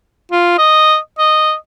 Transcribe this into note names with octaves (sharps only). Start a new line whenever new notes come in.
F4
D#5
D#5